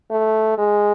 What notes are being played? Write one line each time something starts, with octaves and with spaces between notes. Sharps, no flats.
A3
G#3